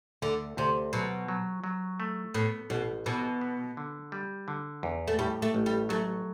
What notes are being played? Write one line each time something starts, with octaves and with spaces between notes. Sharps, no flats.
D2 D3
D2 C3
B2 F#3
F#3
F#3
A3
A2 B3
A1 B2
B2 E3
B3
D3
G3
D3
E2
A3
A2 G3
A3
A1
G3
F#3 A3